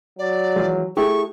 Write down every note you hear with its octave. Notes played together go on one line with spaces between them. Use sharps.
F#3 D5
E3 F3 G#3
A3 E4 G4 G#4 C#6